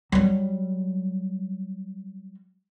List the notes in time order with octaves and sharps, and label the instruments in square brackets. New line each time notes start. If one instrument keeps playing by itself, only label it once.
[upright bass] F#3 G3